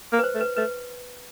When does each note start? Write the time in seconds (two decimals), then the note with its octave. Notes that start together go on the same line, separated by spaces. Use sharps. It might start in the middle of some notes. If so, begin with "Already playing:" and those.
0.12 A#3
0.19 B4
0.24 C5
0.35 A3
0.41 B4
0.56 A3 B4